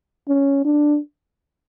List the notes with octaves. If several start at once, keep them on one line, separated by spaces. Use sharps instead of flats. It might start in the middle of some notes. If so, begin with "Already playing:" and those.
C#4
D4